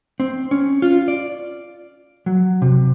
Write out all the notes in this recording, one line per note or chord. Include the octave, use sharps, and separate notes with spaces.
C4
C#4
F4
D5
F#3
C3